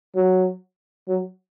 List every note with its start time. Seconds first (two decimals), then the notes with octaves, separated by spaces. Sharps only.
0.16 F#3
1.08 F#3